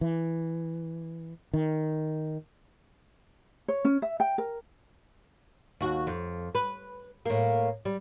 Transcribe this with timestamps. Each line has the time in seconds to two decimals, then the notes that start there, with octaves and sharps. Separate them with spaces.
0.01 E3
1.54 D#3
3.68 C#5
3.85 C#4
4.02 E5
4.20 G5
4.38 A#4
5.80 D#2 F#4
6.07 F2
6.55 B4
7.26 A2 A#3
7.85 G3